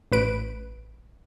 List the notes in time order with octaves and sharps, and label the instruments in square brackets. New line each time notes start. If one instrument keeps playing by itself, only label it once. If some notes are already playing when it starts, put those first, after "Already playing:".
[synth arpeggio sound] A1 B4 D7